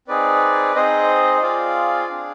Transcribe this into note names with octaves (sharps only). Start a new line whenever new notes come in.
C4 D#4 G#4 B4 D5
C4 D#4 G#4 C5 D#5
D#5
C4 F4 G#4 D5 F5
D4 G#4